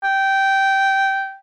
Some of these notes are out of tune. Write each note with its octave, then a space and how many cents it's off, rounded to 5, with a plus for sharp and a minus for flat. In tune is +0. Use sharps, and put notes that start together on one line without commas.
G5 -10